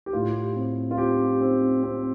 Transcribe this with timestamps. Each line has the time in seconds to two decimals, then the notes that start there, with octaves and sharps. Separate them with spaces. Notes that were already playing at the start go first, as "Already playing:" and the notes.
0.06 G4
0.13 A2 F4
0.56 C4
0.91 F4
0.98 C4 G4
1.41 C4
1.83 C4